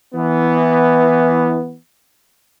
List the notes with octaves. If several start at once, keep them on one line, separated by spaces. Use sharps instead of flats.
E3 B3